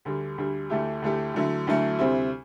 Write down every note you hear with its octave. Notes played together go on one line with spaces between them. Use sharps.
D2 D3 G3
D2 D3 G3
D2 D3 A3 E4 G4
D2 D3 A3 E4 G4
D2 D3 F#3 A3 E4
D2 D3 F#3 A3 E4
D2 C3 G3 C4 E4